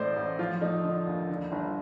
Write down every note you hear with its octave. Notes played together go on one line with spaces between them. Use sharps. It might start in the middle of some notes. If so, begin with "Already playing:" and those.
Already playing: A1 A2 A3 C5 D5 D#5
A1
F3 F4
A3 D#4
D3
D#2
D3
G1